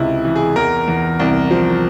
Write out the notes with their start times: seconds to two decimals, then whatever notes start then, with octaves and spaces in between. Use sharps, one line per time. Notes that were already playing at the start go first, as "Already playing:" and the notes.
Already playing: C#2 C3 E4
0.25 E3
0.36 G#4
0.56 E2 A#4
0.88 E2
1.19 C2
1.51 F3